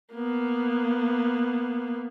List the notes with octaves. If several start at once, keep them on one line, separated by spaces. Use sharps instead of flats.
A#3 B3